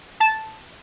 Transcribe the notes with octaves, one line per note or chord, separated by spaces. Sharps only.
A5